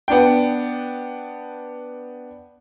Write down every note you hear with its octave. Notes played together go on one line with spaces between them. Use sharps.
B3 D4 G5